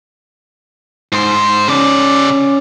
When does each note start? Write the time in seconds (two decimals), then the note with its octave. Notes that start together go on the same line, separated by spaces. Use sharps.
1.12 G#2 C5
1.68 C#3 C#4 D5